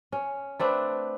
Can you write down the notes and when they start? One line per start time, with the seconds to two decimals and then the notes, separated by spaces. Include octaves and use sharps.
0.12 C#4
0.60 A3 C4 D4 B4